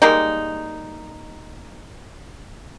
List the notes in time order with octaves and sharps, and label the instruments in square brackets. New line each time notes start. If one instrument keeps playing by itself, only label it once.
[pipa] G3 G#3 A#3 D#4